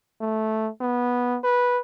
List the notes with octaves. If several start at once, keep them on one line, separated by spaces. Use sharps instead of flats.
A3
B3
B4